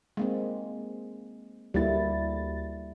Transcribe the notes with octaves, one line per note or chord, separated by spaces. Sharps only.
G#3 A#3 C4
D2 G3 A#3 E4 A6